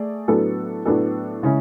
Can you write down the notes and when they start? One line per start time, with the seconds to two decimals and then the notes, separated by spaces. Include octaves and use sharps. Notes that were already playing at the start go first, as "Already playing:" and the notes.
Already playing: A3 G#4 D5
0.28 A2 F#3 B3 D4 A4
0.85 A2 F#3 B3 D4 A4
1.43 C#3 E3 G#3 C#4 E4